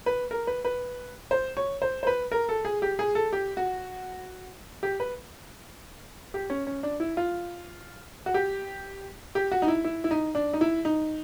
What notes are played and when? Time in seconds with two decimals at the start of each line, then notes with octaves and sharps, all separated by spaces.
0.06 B4
0.31 A#4
0.47 B4
0.65 B4
1.31 C5
1.57 C#5
1.82 C5
2.03 C5
2.07 B4
2.32 A#4
2.49 A4
2.65 G#4
2.82 G4
2.99 G#4
3.15 A4
3.33 G4
3.57 F#4
4.83 G4
5.00 B4
6.34 G4
6.50 C#4
6.67 C#4
6.83 D4
7.00 E4
7.17 F4
8.26 F#4
8.34 G4
9.35 G4
9.52 F#4
9.62 D#4
9.68 E4
9.84 E4
10.04 E4
10.11 D#4
10.35 D4
10.53 D#4
10.61 E4
10.85 D#4